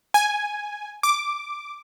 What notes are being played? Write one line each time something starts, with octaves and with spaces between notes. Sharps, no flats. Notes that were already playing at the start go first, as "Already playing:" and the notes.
G#5
D6